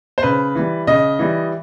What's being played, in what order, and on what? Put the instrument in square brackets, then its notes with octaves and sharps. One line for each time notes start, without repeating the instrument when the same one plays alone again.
[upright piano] C5
C#3 B4
E3 G3
C#3 D#5
E3 G3